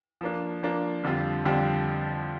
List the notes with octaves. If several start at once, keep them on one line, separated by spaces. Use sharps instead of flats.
F3 A#3 D4
F3 A#3 D4
F2 D3 G3 C4 F4
F2 D3 G3 C4 F4